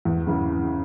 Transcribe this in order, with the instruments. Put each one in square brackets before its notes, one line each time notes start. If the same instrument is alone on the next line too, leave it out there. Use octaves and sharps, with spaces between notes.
[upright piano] E2
C#3 E3